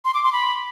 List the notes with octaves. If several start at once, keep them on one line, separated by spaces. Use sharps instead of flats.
C6
D6
C6
B5